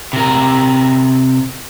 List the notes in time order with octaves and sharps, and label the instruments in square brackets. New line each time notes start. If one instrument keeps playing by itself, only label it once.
[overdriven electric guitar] C3 A#4